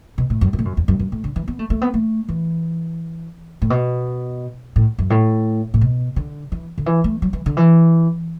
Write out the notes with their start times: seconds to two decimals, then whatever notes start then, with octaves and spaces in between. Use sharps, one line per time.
0.18 B2
0.30 A2
0.41 F#2
0.53 F#2
0.59 A2
0.65 F#2
0.77 E2
0.88 F#2
0.99 F#2
1.12 A2
1.24 D3
1.36 E3
1.48 B3
1.59 A3
1.70 A3
1.82 B3
1.94 A3
2.28 E3
3.62 A2
3.70 B2
4.76 A2
4.99 F#2
5.10 A2
5.74 A2
5.81 B2
6.16 D3
6.52 E3
6.78 D3
6.86 E3
7.04 A3
7.22 F#3
7.33 E3
7.46 D3
7.57 E3